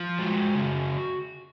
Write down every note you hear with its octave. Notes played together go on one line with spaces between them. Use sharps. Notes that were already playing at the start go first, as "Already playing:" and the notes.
Already playing: F3
G#3 F#4
C#3